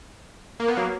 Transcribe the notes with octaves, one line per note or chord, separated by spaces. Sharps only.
A#3
B3
F#3 A#3